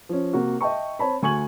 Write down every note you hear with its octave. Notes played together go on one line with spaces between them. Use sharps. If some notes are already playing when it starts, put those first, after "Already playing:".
F3 C#4
C3 A#3 F#4
D#5 E5 G5 A5 C#6
C4 C#5 A5 B5
D2 G#5 C#6 G#6 F#7